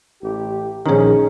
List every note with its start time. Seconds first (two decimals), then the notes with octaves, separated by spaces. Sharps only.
0.23 A1 G4
0.86 A#1 D#3 C#4 D#4 G#4 C#5 A#5